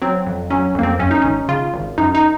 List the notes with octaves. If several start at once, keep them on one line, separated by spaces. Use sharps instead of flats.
F#3 C4
F2
F#3 C#4
F2 A#3
C4
F#2 C#4
D#4
G#1 C#4
C#3 F4
G#1
F#2 D#4
D#4